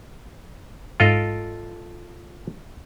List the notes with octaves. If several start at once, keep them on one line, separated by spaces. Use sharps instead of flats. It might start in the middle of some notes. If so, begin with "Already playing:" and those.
G#2 F4 A4 D#5 F5 D7